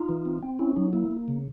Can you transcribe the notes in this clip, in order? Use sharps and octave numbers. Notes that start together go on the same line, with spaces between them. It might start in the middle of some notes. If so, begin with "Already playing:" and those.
Already playing: D#4 F4
E3
C4
C4
C#4 E4
F#3 D#4
A#3 E4
A#3
C#3